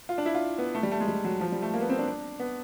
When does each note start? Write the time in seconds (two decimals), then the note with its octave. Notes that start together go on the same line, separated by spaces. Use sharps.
0.09 F4
0.18 D4
0.26 E4
0.35 F4
0.58 B3
0.75 A3
0.83 G3
0.92 A3
1.00 G#3
1.08 G3
1.25 F#3
1.41 F3
1.52 G3
1.62 A3
1.73 A#3
1.81 B3
1.90 C4
1.99 D4
2.39 B3